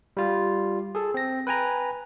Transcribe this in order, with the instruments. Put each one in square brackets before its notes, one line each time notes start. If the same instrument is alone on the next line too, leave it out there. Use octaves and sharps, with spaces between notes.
[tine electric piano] G3 F4
G#4 A4
C4 A#6
B4 G5 G#5 A#5